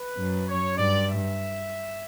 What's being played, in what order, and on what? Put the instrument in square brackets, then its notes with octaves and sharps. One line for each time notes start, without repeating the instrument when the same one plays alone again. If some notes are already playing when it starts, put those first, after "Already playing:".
Already playing: [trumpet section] B4
[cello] F#2
[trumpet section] C#5
[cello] G2 [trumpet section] D5
[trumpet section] E5